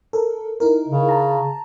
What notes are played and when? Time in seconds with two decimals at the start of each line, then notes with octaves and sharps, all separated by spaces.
0.13 A4 A#4
0.60 D#4 E4 A#4
0.88 C#3
1.09 A5 A#5